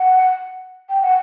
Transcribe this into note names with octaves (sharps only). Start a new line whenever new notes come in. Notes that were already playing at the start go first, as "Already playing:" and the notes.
Already playing: F#5
G5
F#5